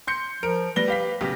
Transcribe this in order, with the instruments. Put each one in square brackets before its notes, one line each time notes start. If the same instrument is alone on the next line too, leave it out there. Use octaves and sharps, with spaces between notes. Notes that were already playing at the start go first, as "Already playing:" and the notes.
[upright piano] C6 G6 C#7
[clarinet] F3 [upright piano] A#4 D7
[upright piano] G3 A#6 G7 [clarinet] B4
[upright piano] G4 F5 B6
B1 C#3 G4